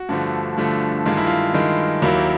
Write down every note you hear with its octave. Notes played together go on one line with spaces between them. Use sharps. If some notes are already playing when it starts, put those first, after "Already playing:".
Already playing: F#4
G2 D3 F3 A3
G2 D3 F3 A3
G2 D#3 G#3 F4
E4
F4
G2 D#3 G#3
D#2 D#3 F#3 A#3 E4